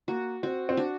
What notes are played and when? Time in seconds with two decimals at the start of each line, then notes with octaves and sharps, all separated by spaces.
0.08 A#3 F#4
0.43 C4 F#4
0.69 C4
0.77 D4 F#4